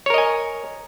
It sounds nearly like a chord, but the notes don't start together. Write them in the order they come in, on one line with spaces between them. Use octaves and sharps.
C#5 A#4 D#5 G#5